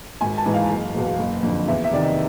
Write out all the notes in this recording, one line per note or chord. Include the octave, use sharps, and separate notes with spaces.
G#1 G#5
A5
G#2 E3
F5
F#1
E2 B2
F#1
F2 D3
E2 E5
E5
C3 D#3 D5
D#5